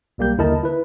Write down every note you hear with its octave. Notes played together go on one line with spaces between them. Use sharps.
B1 G3 A#3 G4 G6
D#2 D3 E4 A#4 D#5 A5
E4 B4